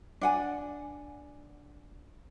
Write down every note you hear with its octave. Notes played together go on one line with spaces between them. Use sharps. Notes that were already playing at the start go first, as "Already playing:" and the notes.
D4 F#5 G#5